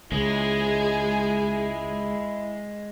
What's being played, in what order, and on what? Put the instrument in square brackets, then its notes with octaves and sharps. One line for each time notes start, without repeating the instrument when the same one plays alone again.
[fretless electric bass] C#2 [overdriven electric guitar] G#3 [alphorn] E4 [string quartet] G#4